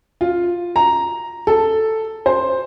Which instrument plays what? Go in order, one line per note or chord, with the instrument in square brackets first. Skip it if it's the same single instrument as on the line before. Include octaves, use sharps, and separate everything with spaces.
[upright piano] F4
A#5
A4
C5